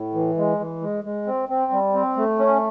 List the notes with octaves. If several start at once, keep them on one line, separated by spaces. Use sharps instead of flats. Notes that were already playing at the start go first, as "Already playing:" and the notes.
Already playing: A2
E3
G#3
E3
G#3
G#3
C4
C4
G3
C4
A3
C#4